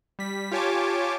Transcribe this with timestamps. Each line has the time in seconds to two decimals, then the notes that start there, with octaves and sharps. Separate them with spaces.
0.19 G3 B6
0.51 F4 G4 C#5 G#5 A5 D6